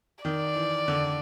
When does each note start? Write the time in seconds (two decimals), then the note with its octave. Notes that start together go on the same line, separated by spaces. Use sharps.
0.24 D#3 D5
0.55 E3
0.88 D3